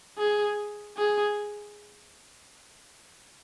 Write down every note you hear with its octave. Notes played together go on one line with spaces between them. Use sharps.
G#4
G#4